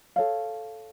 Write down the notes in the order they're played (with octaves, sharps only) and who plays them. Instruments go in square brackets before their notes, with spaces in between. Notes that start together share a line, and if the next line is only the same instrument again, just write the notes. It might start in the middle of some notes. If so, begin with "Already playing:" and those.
[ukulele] A4 C#5 F5